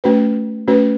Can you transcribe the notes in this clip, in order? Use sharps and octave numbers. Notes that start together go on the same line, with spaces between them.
A3 C#4 F#4 B4
A3 C#4 F#4 B4